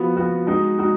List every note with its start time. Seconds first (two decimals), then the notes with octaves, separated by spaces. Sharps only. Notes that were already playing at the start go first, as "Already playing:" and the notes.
Already playing: F3 B3 F#4
0.15 F3 B3 F#4
0.47 G#3 D#4 F#4
0.78 G#3 D#4 F#4